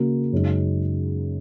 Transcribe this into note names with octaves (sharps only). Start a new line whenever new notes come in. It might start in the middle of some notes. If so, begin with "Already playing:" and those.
Already playing: C#3 A#3 F#4
F#2 C#3 G#3 D#4